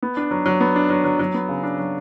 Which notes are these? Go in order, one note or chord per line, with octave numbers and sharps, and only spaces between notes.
B3
D4
F#3
F#3
B3
D4
F#3
F#3
F#3
B3
C#3
D4
F#3